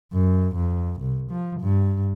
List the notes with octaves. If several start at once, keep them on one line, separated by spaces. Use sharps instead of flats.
F#2
F2
C2
F3
G2